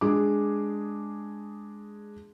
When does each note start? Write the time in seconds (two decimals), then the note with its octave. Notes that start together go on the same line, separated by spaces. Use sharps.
0.01 G#3 D4 G#4 D6